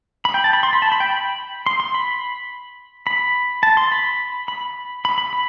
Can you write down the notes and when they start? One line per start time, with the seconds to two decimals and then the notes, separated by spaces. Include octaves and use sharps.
0.25 B5
0.34 G5
0.44 A5
0.53 B5
0.63 C6
0.73 B5
0.82 A5
0.92 B5
1.00 G5
1.10 B5
1.66 C6
1.80 C6
1.94 B5
3.07 B5
3.63 A5
3.77 C6
3.92 B5
4.48 B5
5.05 B5
5.18 B5
5.33 B5